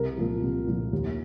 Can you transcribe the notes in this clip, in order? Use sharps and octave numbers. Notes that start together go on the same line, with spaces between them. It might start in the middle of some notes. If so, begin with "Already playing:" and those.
Already playing: C2 A#4
A#2 F3
C2
A#2 F3
D#2